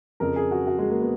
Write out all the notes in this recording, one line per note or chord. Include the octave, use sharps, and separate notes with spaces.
F2 C#3 A#4
G#4
F#4
F#4
G#3
A#3
B3